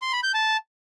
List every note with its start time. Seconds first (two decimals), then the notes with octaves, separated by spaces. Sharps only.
0.02 C6
0.13 B5
0.23 G6
0.34 A5